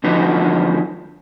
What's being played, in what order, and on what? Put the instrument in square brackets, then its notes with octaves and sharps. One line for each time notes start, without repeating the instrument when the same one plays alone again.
[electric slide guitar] E2 D3 F3 D#4 F#4 B4